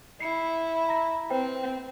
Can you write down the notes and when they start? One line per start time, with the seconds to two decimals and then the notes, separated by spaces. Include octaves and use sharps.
0.20 E4 C7 C#7
0.89 A#5 A#6
1.30 C4 B4 C5 G5